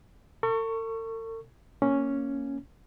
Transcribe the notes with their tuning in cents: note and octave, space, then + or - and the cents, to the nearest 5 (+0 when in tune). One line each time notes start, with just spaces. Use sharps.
A4 +45 C#6 +0
A#3 +0 C#4 +0